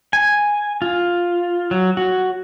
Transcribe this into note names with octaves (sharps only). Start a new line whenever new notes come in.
G#5
F4
F#3
F#4